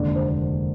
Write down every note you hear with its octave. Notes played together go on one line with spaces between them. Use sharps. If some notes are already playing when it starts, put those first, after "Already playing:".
Already playing: F1 D#2 D3 G#3 D4 D5
C5